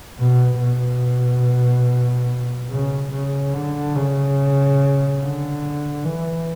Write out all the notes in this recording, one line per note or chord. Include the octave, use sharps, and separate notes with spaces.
B2
B2
C#3
C#3
D3
C#3
D3
E3